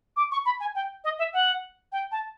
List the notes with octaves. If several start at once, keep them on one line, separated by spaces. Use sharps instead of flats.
D6
C#6
B5
G#5
G5
D#5
E5
F#5
G5
A5